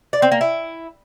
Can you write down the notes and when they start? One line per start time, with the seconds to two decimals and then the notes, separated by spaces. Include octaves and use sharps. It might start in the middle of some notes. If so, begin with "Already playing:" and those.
0.13 D5
0.22 C4
0.32 A#3
0.41 E4